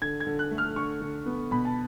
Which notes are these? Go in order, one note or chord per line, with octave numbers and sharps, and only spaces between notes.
D3 G#6
G#6
D3
F#6
A3
F6
D3 C#6
D3
B3
B2 B5
A5